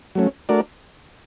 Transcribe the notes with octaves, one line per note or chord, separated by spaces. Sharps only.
F#3 A3 C#4
A3 D4 F#4 A#4 D5